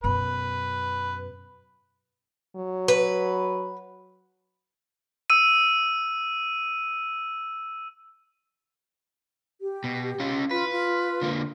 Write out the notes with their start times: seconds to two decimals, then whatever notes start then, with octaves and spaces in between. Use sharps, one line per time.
0.04 F#2 B2 B4
2.56 F#3
2.88 B4
5.30 E6 D#7
9.61 G4
9.84 B2
10.20 C#4 F4
10.51 F4 B4
10.72 F4
11.22 D3 A#3